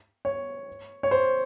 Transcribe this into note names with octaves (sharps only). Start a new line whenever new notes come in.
C#5
C#5
C5